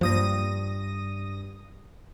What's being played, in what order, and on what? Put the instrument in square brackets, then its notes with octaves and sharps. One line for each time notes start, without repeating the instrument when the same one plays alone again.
[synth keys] G2 D#6 A#6 [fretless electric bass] F3 A#3